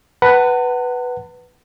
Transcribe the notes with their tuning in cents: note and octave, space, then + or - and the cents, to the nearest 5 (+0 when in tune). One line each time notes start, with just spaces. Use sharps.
B4 +0 F#5 +20 A5 +45